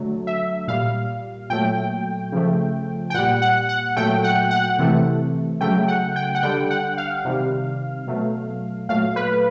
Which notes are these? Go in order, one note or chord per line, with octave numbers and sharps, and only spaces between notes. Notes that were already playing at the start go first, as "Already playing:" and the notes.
Already playing: D3 F#3 A3
E5
A#2 G3 F5
A#2 F#3 A3 G5
C#3 F3 A3
G5
A#2 G3 F#5
F#5
F#5
A#2 F#3 A3 G5
F#5
F#5
C3 E3 A3
C#3 F#3 A3 G5
F#5
G5
F#5
D3 G3 G5
F#5
F5
C3 D#3 G3
B2 F#3 A3
A#2 F#3 A3 F5
B4